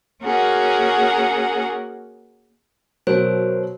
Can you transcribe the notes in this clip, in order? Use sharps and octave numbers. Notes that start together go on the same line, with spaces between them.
A#3 C#4 F#4 G#4 A#4 F#5
B2 F#3 A#4 C5 C#5